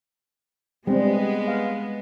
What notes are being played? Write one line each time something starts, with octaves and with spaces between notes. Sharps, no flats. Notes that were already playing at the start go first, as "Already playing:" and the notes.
G3 G#3 B3 C4
F5